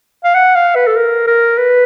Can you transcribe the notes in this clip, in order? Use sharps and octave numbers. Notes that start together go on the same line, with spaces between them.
F5
F#5
F5
B4
A4
A#4
A#4
B4